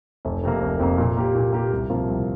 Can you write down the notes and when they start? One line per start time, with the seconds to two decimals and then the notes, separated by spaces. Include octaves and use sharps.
0.25 F1
0.43 F2 C3 A#3
0.62 F1
0.79 F2 C3 A#3
0.98 A#2
1.17 A#3 G4
1.35 A#2
1.53 A#3 G4
1.72 C2
1.90 C3 F3 A#3 F4
2.08 C2